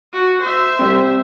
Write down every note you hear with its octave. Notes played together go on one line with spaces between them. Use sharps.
F#4
C5 E5
G3 C4